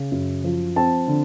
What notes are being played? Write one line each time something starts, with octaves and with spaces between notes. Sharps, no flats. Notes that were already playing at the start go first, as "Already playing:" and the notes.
Already playing: C#3
F#2
F3
C4 A5
D3